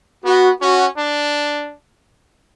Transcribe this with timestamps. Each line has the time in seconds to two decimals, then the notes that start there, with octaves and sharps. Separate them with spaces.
0.25 B3 F#4
0.61 C#4 F#4
0.97 D4